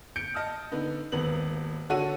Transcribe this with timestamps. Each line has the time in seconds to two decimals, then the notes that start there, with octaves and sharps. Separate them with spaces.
0.16 G6 C#7 D7
0.34 D#5 A5 D#6 F6
0.72 D3 B3 D#4
1.12 D#1 G#1 B3 F#7
1.90 D3 F#4 A4 C#5 F#5 D#7